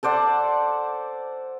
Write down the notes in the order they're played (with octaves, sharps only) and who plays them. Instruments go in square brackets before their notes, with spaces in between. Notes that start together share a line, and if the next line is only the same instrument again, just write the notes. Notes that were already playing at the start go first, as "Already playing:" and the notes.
[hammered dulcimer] A4 C5 D5 F#5